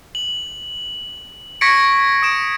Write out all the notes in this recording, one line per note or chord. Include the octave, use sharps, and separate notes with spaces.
F#7
C#6 G#6 A#6 B6 C#7 D7
D#6 D7 E7